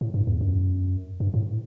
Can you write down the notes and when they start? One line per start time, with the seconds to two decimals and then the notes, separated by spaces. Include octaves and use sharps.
0.01 A2
0.14 G2
0.27 E2
0.41 F#2
1.20 G2
1.34 A2